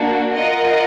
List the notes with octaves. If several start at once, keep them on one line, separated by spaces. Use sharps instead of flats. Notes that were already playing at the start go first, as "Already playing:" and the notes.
Already playing: A#3 D4 F#4
F4 A#4 D#5 F#5